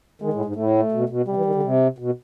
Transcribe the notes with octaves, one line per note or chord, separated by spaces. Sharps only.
D#3 G#3
A2
G#2
A2 A3
B2
B2
C3 G3
E3
D#3
D3
C3
B2